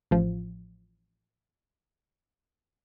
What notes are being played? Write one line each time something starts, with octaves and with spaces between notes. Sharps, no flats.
A1 F3